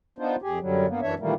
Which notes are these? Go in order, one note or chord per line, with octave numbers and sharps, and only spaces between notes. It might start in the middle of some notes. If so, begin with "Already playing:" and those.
B3 D4 D#4 F4 C5
F2 G4 G#4
F#2 D3 F#3 G3
G2 A#3 B3
F#2 E3 D4 C#5 E5
A#2 D#3 E3 G3 A3 A#3